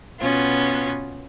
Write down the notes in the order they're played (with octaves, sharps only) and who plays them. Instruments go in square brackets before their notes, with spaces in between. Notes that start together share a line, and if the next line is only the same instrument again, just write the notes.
[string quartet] B2 B3 C#4 F4